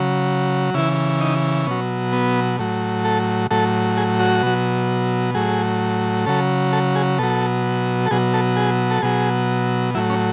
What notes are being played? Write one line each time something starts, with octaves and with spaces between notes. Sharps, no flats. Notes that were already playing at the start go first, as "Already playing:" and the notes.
Already playing: C#3 F#3
C#3 E3 E4
D#4
B2 F#3 C#4
B3
A2 F#3
A4
A2 F#3 A4
G#4
F#4
B2 F#3
A2 F#3 G#4
C#3 F#3 A4
A4
G#4
B2 F#3 A4
A4
B2 F#3 G#4
A4
G#4
A4
B2 F#3 G#4
A2 F#3 E4
C#4